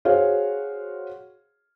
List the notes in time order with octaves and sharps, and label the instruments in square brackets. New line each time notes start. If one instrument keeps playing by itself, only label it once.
[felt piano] F#4 G#4 C5 C#5 F5